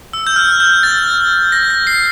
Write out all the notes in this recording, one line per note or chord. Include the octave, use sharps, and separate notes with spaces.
E6
G6
F6
G6
A6
A#6
A#6
C7